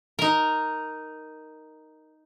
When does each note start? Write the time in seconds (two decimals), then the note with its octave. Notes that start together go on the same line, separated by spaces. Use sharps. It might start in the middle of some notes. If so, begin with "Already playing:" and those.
0.19 D#4 A#4